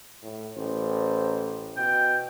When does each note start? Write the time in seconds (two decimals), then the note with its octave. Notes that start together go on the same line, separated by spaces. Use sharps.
0.23 A2
0.57 A1 C5
1.77 B2 G5